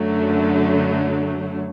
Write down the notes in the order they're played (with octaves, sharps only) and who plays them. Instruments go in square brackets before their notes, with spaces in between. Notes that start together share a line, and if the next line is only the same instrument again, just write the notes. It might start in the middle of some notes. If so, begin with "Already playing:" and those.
Already playing: [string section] F#2 D3 F#3 A3